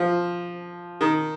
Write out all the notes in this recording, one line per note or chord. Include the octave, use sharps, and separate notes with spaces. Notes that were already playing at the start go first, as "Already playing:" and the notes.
Already playing: F3
D#3